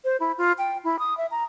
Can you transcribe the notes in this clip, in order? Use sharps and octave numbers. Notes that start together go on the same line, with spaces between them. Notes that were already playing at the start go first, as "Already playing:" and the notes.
C5
E4
F4
G5
E4
D#6
E5
A#5